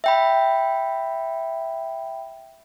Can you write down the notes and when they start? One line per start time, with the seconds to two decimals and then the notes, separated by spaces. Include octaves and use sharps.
0.04 E5 G5 B5